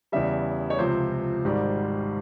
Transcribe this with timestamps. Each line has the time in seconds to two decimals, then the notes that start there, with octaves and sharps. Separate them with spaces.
0.12 E2 C#3 G3 E5
0.70 C#5
0.78 C#2 C3 F3 C5
1.44 G#1 G#2 G3